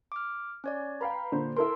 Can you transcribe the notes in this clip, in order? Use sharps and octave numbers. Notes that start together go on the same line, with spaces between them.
D6 F6
C#4 C#5 D5
B4 F5 G5 A#5 B5
A#2 D3 C5
E4 A4 A#4 C6 E6